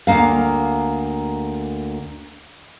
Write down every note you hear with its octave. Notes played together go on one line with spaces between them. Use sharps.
D2 G2 A#3 F5